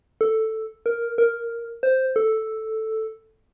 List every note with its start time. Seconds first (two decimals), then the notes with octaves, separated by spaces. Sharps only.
0.21 A4
0.86 A#4
1.18 A#4
1.83 C5
2.16 A4